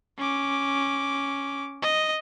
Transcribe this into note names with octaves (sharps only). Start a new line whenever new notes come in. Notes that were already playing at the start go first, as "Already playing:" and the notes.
C#4 D6
D#5